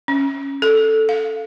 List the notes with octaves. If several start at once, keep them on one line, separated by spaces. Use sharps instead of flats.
C#4
A4
F5